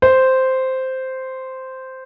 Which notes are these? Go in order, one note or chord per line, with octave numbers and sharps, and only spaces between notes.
C5